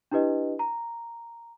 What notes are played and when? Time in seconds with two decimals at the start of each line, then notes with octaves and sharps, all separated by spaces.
0.12 D4 E4 G4 B4 D#5
0.59 A#5